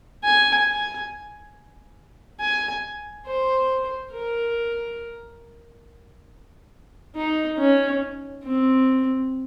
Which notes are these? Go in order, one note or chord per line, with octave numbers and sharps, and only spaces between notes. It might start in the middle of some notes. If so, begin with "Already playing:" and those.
G#5
G#5
G#5
C5
A#4
D#4
C#4
C4